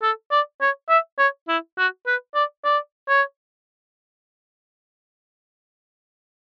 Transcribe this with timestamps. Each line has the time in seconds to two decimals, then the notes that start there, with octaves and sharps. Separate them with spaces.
0.02 A4
0.31 D5
0.61 C#5
0.89 E5
1.18 C#5
1.48 E4
1.78 F#4
2.07 B4
2.35 D5
2.64 D5
3.08 C#5